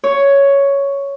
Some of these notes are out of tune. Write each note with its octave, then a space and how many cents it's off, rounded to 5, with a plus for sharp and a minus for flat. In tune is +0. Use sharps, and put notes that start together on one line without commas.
C#5 +5